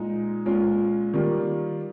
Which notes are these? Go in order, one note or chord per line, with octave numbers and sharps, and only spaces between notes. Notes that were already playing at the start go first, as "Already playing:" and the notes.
Already playing: A#2 G#3 D#4
A#2 G#3 C#4 F4
D#3 G3 A#3 F4